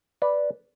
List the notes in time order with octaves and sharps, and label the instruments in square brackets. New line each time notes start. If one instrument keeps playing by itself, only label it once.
[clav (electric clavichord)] B4 D5